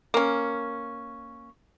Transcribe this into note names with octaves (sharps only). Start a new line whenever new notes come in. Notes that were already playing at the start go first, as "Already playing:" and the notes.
A#3 C#4